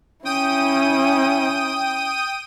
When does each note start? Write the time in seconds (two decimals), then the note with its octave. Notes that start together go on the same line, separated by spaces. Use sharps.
0.25 C#4 E4 G5 D#6 D#7